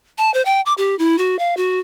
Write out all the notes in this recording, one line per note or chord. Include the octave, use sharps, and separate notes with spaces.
A5
C5
G5
D6
G4
E4
F#4
F5
F#4